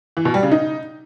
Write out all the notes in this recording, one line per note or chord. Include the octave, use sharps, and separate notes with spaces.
E3
B2
G3
C#3
D#4